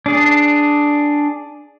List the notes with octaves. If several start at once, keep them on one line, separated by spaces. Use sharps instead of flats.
D4 G#4